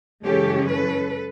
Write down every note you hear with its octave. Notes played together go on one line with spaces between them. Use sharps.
F#2 C#3 E3 G#3 C#4 G4 A4
A4 B4